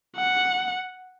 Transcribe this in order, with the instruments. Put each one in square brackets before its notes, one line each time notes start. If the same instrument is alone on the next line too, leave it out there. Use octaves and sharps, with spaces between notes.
[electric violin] F#5